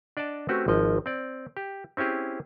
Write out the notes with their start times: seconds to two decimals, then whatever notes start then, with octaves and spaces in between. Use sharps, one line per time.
0.17 D4 D5 D#5 F#5 A5
0.49 A3 C4 C#4 F#4 G4 B4
0.68 G#1 F3 D#5
1.06 C4 D5
1.57 G4
1.97 C4 C#4 E4 G4 G#4